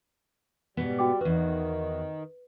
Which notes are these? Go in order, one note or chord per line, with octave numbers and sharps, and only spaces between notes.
G#2 B2 G3 B3
F#4 G5 D6
E2 D#3 F#4 B4